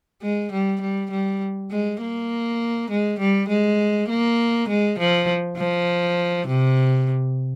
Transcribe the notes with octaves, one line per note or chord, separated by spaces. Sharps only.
G#3
G3
G3
G3
G#3
A#3
G#3
G3
G#3
A#3
G#3
F3
F3
C3